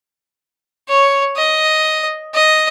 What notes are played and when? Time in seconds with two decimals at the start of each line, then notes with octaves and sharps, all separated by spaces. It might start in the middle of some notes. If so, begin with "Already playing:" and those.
0.88 C#5
1.36 D#5
2.35 D#5